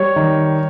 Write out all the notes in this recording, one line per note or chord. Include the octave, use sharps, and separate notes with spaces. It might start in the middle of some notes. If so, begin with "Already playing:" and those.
Already playing: G3 C#5
D#3